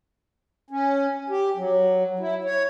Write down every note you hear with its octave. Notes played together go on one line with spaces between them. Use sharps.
C#4
G4
F#3
E4
C#5